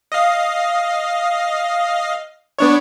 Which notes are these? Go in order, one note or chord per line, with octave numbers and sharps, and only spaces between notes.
D#5 F5
B3 D4 C#5